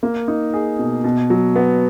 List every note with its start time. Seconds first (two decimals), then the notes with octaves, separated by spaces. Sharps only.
0.03 A#3
0.28 D#4
0.54 G#4
0.79 B2
1.04 B2
1.30 F#3
1.56 B3